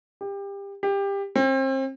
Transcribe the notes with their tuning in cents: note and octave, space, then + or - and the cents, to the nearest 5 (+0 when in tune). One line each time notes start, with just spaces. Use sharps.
G4 +25
G4 +20
C4 +35